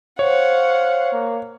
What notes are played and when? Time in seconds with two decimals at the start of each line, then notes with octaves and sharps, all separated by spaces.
0.19 C5 C#5 F5 F#5
1.13 A#3